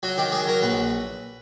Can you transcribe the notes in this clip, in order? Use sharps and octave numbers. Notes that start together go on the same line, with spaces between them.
F#3 F#4
D#3 G4
F#3 G#4
F#3 A#4
A#1 B4